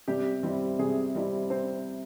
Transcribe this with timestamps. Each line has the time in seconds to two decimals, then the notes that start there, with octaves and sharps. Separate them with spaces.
0.08 C3 G3 G4
0.43 G3 C4 E4
0.79 C3 G#3 G#4
1.15 G3 C4 E4
1.50 C4 C5